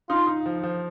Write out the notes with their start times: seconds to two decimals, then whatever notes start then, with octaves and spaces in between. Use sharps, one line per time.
0.09 D#4 F4
0.27 D#4
0.46 F3
0.63 F3